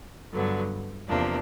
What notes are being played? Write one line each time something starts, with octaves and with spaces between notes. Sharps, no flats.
G2 D3 F#3 B3
E2 C3 F3 A#3 D4